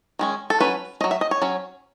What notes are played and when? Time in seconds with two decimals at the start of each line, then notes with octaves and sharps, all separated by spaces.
0.19 D#3 G#3 C#4
0.50 A4
0.60 F#3 C#4 B4
1.01 C#4 D#5
1.04 F#3
1.11 E5
1.21 D#5
1.31 C#5
1.42 F#3 C#4